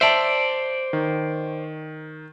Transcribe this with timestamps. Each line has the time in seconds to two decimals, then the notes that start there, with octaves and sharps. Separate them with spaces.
0.01 C5 D5 E5 A5
0.93 D#3